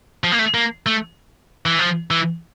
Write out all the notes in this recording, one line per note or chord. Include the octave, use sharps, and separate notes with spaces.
F3
A#3
A3
A#3
A3
E3
F3
E3